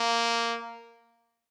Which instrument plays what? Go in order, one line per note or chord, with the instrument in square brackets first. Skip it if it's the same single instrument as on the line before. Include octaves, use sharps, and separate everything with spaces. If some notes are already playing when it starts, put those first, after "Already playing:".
Already playing: [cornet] A#3